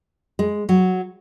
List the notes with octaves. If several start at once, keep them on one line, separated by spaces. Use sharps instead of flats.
G#3
F#3